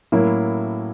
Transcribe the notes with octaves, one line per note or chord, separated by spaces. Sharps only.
A2 F#3 A#3 C#4 E4